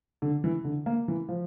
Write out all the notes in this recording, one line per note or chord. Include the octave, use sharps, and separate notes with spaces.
D3
E3
D3
A#3
E3
F3